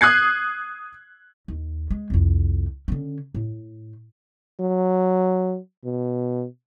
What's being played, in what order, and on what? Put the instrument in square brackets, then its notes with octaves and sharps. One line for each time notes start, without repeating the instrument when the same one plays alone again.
[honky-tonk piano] D#6 F#6 G#6 C7
[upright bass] D#2
G#3
C2 F2
D3 C#4
A2
[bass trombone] F#3
B2